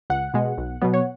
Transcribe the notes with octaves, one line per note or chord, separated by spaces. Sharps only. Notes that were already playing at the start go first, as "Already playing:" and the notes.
C#2 F#5
B2 G#3
B1
B2 F#3 B3
C#5